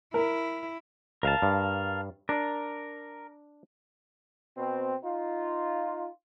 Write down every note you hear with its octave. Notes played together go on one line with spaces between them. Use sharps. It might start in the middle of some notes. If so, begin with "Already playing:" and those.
E4 A#4
C#2 A#4 F5 A5
G2
D4 A#4 D5
B2 C4
D#4 F4